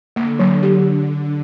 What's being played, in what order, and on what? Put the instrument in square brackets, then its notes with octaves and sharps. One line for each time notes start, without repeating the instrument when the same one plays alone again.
[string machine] D3 [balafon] A#3
[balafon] F#3
G4